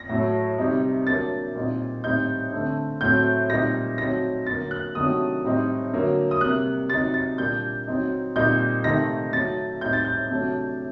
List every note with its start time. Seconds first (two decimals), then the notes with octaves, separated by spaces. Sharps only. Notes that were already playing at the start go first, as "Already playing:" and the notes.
Already playing: A#6
0.09 A2 F#3 A3
0.58 C3 G3 C4 D#4
1.07 F#3 A#3 D4 A6
1.55 A#2 G3 C4 D#4
2.04 A2 G3 C4 D#4 G6
2.52 D3 A3 C4
3.01 A2 F#3 A3 C4 G6
3.49 A#2 G3 C4 D#4 A#6
3.98 F#3 A3 C4 D#4 A#6
4.47 D3 F#3 A#3 A6
4.71 F#6
4.95 C3 D#3 F#3 A3 D4 D#6
5.44 A2 G3 C4 D#4
5.92 D3 F#3 A#3
6.31 D#6
6.41 C3 G3 A#3 F#6
6.90 C3 F#3 C4 D#4 A6
7.14 A6
7.38 A#2 G3 A#3 D4 G6
7.87 F#3 C4 D#4
8.36 A#2 G3 C4 D#4 G6
8.84 C3 D#3 A3 C4 D#4 A#6
9.32 F#3 A3 D#4 A6
9.81 A2 G3 C4 D#4 G6
9.93 A6
10.05 G6
10.30 C3 F#3 A3 D4